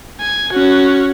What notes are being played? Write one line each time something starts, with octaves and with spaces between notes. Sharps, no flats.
G#5
C#4 F#4